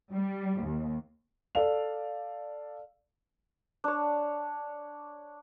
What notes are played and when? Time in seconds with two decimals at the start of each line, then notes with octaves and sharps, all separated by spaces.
0.14 G3
0.63 D#2
1.55 A4 D5 F5 F7
3.84 D4 C#5